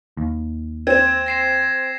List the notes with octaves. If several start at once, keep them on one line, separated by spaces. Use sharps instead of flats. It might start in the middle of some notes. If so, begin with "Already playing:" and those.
D#2
C4 G#6 E7
A#6 C7 E7